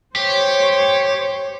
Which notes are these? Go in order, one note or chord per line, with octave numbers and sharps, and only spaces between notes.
G4 C5 C#5